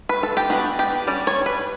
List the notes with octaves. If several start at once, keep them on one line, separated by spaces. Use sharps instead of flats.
B4
A4
G4
E3 B3 D4 F#4
G4
G3 C#4 D5
C#5
B4